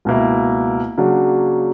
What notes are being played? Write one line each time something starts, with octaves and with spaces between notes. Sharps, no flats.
C#2 B2 A#3 E4
C#3 F#3 A#3 D4 F#4